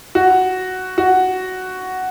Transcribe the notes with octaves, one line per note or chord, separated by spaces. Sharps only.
F#4
F#4